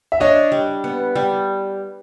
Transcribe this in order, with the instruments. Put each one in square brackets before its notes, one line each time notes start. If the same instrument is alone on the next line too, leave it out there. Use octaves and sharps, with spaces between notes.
[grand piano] E5
[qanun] D4 [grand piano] C#5 D#5
[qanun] G3
B3
G3